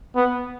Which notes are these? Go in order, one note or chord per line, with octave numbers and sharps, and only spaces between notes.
B3